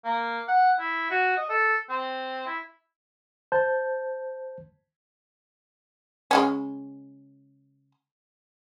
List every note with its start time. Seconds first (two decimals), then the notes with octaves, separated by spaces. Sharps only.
0.05 A#3
0.48 F#5
0.79 E4
1.11 F#4
1.37 D#5
1.49 A4
1.89 C4
2.46 E4
3.52 C5 A5 G6
6.31 C#3 G#3 C#4